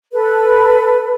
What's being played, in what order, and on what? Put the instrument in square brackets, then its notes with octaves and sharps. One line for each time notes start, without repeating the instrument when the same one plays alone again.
[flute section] A4 B4